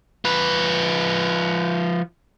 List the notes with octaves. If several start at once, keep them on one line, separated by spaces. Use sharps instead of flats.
F3 B4